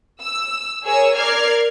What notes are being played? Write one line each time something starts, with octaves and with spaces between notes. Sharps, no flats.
E6
G#4 A#4 C#5 E6
A#4 D5 F6 G#6 C7